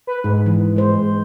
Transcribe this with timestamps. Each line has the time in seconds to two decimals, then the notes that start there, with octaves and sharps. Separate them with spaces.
0.07 B4
0.24 G#2 D#4
0.46 E3
0.76 G#3 C5